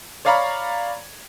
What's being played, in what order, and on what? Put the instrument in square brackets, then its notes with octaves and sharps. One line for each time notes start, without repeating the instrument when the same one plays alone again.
[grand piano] C#5 D5 F5 A#5 B5 C#6